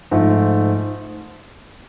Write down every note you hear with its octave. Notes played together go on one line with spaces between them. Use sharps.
G#2 F3 A3